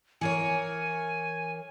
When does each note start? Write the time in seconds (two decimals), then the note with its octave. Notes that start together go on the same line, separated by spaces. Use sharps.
0.21 E3 A#4 C#5 G#5